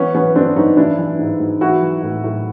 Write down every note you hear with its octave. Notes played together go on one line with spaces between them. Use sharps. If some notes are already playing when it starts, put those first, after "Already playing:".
Already playing: E3 B3 C#4
E3 B3 C#4
G2 C4 D4
G2 C#4 D#4
E3 D4 E4
E3
G#2
G#2
E3 E4 F#4
E3
A2
A2